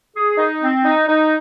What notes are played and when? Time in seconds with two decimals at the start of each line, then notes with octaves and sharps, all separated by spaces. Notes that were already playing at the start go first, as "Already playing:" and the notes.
0.15 G#4
0.38 D#4
0.61 C4
0.84 D#4
1.07 D#4